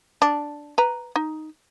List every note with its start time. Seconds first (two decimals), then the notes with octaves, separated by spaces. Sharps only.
0.22 D4
0.78 B4 A#5
1.16 D#4